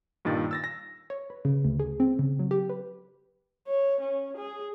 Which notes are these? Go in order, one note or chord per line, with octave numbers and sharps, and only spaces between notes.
G2 A#2 D#3 A6
E6 A6 A#6
A#6
C#5
B4
C#3
D2
G#4
C4
C#3
F#3
G4
B4
C#5
C#4
G#4